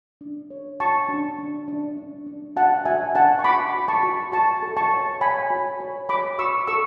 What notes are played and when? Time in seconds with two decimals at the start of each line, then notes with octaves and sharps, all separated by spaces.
0.21 D4
0.50 C#5
0.80 F#4 A5 C#6
1.09 D4
1.39 D4
1.68 D4
1.97 D4
2.27 D4
2.56 F#4 F#5 A5
2.85 F#4 E5 G#5
3.15 D4 F#5 A5
3.39 C#6
3.44 F#4 B5 D6
3.74 F#4
3.88 A5 C#6
4.03 F#4
4.32 F#4 A5 C#6
4.63 A4
4.77 A5 C#6
4.92 C#5
5.20 C#5 G#5 B5
5.50 F#4
5.80 C#5
6.09 F#4 B5 D6
6.39 F#4 C#6 E6
6.67 A4 C#6 E6